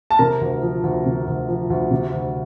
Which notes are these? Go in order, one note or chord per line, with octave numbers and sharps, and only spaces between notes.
A5
C3 A#4 A#5
D2
F3
D2
C3
D2
F3
D2
C3
D2